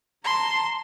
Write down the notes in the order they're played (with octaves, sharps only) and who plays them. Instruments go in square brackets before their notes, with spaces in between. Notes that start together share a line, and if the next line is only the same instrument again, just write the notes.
[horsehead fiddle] A5 A#5 [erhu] C6